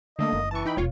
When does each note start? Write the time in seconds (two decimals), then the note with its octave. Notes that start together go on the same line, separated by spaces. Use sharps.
0.19 D3 A3 A#3 D#5
0.32 F#1
0.51 E3 A5 C#6
0.66 D#4 G5 B5
0.77 E1 F4 C#5